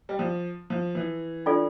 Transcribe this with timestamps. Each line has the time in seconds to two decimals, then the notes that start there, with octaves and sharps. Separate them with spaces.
0.09 G3
0.19 F3
0.70 F3
0.95 E3
1.46 D4 F4 A4 D5